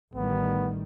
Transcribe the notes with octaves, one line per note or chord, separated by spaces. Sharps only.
A1 D#3 G3 B3